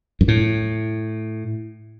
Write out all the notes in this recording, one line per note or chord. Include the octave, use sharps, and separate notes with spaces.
F#2
A2